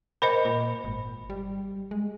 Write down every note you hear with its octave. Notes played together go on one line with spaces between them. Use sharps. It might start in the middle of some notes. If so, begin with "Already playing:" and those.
A#4 C5 D#5 B5
A#2
G#1
G3
G#3